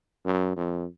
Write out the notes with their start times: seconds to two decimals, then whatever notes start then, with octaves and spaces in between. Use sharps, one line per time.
0.25 F#2
0.56 F2